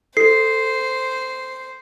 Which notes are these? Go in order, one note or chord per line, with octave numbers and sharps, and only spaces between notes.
A4 C5 C7